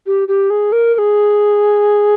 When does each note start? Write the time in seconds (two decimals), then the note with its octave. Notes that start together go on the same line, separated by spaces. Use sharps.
0.07 G4
0.28 G4
0.50 G#4
0.72 A#4
0.94 A#4
0.98 G#4